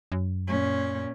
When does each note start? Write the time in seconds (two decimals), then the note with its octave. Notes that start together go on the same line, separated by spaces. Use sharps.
0.12 F#2
0.47 A#2 C#4